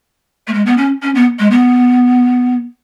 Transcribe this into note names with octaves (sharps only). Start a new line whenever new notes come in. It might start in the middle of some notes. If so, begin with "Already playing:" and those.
A3
G#3
B3
C#4
C#4
B3
G#3
B3